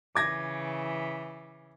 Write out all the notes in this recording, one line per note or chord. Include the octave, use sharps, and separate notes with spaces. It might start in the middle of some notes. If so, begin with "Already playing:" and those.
C#3 E3 D6 G#6 A#6